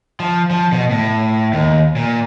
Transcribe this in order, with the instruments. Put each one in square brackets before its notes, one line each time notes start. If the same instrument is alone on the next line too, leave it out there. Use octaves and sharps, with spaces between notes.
[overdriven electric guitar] F3
F3
B2
A2
D#2
A#2